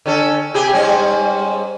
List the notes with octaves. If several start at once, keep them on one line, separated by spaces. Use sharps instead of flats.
D3 C#4 A4
C3 G4 G#4
G#2 G3 C#4